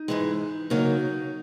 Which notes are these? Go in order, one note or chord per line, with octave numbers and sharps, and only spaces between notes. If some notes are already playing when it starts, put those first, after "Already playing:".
Already playing: D#4
G#2 E3 G#3
C#3 F#3 A#3 D#4